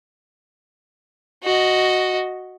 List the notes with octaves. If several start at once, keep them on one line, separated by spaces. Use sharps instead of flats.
F#4 D#5